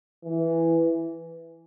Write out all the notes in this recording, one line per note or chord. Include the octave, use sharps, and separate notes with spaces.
E3